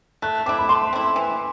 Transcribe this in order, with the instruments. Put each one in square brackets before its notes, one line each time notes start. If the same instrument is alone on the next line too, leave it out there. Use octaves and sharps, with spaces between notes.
[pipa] A3 [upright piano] F#6
[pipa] C4 E4 [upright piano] D6
[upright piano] B5
[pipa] A3 [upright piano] C6
[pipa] C4 E4
E3